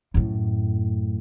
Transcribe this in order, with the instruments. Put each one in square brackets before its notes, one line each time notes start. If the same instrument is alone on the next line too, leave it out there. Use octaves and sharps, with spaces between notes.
[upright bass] F#2 A2